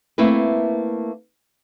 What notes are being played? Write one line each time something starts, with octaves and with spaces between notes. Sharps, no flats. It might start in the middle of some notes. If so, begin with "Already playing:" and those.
A3 A#3 C4 E4 A#4 B4